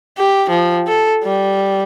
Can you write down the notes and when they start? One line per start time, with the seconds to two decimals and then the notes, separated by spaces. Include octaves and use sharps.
0.18 G4
0.50 F3
0.88 A4
1.24 G3